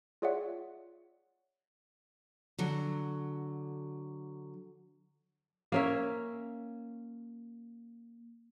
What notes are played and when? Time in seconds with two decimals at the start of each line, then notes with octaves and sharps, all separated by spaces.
0.22 F4 G#4 C#5 D5 E5 F#5
2.58 D3 F#3
5.72 A#3 C#4 E5